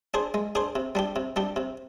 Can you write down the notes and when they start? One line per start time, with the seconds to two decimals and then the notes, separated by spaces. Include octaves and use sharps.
0.14 D4 G#4 C5
0.34 G#3
0.55 D4 G#4 C5
0.76 C3
0.95 G3 D4 G4
1.16 C3
1.36 G3 D4 G4
1.56 C3